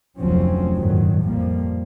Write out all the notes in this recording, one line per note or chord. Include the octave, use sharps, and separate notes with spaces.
F1 D2 F3 F#3 C4 C#4
G1 F2 A2 D#3 F#3
A#1 F2 F3 G3 A#3